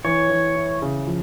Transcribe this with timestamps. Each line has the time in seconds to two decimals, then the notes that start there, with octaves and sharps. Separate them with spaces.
0.04 E3 C#5
0.29 E3
0.56 E4
0.82 C#3
1.07 F3